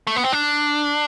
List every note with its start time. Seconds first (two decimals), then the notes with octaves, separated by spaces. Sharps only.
0.07 A3
0.16 B3
0.24 C4
0.32 D4